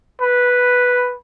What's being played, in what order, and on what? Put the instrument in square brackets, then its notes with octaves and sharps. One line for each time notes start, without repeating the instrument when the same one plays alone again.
[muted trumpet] B4